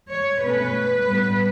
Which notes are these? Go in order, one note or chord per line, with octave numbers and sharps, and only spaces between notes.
C#5
B2 A3 C#4 B4
A2 G3 B3